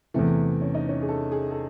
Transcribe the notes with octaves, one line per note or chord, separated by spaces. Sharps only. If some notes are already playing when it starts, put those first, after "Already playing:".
E2 C3 E3 A3
C#4
D#4
C#4
G#4
A4
G#4
A4